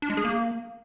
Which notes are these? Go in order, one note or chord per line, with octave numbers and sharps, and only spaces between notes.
D4
G#3
G#4
A#3